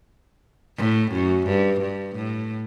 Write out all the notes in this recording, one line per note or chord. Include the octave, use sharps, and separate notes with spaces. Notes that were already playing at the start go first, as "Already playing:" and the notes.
A2
F#2
G2
G2
A2